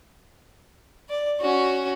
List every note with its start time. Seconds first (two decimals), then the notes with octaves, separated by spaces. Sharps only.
1.09 D5
1.41 C#4 F#4